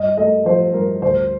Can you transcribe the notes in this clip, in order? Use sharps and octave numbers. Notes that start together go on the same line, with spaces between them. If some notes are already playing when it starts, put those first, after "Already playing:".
Already playing: G2 D#5
A3 D#5
F3 C5
G2 A#4
D2 C5